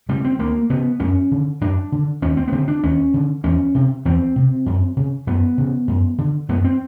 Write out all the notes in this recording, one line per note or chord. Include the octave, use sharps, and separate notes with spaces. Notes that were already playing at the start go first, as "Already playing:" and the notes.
C#3 G3
C4
D2 A#3
C#3 B3
F#2 C#4
D3
F#2 D4
D3
D#2 C#4
C4
B3
D3 C4
D4
D#2 C#4
D3
E2 C#4
C3
E2 C4
C3
F#2
C#3
F#2 B3
C#3
F#2
D3
F#2 B3
C4